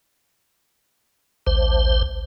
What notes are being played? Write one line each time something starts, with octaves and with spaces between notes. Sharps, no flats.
A1 D2 C5